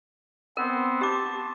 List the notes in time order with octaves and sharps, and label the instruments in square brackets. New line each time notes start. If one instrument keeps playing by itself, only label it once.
[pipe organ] B3 C4 [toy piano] A#4
[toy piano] G4 D6 [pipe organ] A5